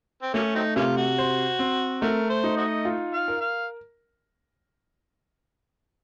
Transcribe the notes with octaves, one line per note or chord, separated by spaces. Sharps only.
C4
F#3 A3 A#3 C#4
F#3 C4 D#4
C3 A#3 C#4 F4
F#4
C5
C4
A3 D#4 F#4 A#4
C5
D#4
F#4 C5 D#5
F4
F5
A#4
F5